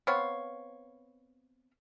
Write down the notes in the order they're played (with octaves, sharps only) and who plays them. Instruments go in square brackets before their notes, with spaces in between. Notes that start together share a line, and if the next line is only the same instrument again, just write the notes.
[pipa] B3 C4 C#5 F5